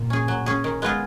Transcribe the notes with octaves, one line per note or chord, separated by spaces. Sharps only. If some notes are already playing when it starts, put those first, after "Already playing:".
Already playing: A#2
C#4 G#4
F#3
C#4 G#4
D#3
G#3 B3 F4 G#4